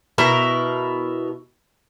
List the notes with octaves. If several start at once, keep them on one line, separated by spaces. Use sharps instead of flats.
B2 E4 A#4